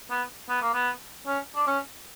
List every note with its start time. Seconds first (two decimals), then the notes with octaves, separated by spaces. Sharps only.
0.11 B3
0.49 B3
0.62 A#3
0.73 B3
1.27 C#4
1.55 D4
1.67 C#4